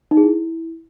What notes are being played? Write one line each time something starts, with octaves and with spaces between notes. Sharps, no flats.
D#4
G#4
E4